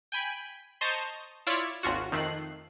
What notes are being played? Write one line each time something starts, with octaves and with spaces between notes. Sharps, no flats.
G5 G#5 B5
C5 D#5 A5 A#5 C#6
E4 F4 C#5 D5
G#1 D#2 F4 F#4
F2 D#3 A3 F#6 C7